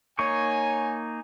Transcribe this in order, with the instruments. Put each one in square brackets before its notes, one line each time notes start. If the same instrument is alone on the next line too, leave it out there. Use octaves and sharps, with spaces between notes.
[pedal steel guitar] A#3 D#4 C#6 [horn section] C#5 G#5